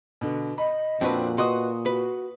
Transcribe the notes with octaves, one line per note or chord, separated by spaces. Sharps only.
B2 D3
D#5 B5
F2 A#2 C4 D4 F#4 B4
F#4 B4 D#5 C6 C#6 D#6
F#4 B4